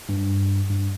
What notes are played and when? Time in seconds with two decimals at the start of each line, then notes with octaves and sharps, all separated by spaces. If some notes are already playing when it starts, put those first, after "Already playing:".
0.09 G2
0.70 G2